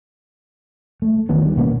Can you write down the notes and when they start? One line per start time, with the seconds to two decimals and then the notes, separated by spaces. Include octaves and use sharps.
1.02 A3
1.29 D2 D#3 B3 C#4
1.45 G3
1.57 B2 A#3 B3 C#4